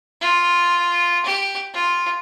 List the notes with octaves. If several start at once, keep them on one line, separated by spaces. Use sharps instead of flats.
F4
G4
F4